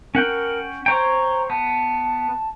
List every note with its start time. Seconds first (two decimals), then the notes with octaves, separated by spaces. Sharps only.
0.15 C#4 A#4 F#5 G5
0.86 C5 C#5 G5 A#5
1.50 B3 A5